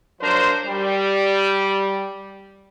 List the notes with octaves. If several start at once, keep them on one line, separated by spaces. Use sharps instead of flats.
F3 F#3 D4 A#4 C5
G3